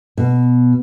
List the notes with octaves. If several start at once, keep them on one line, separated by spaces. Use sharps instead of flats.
B2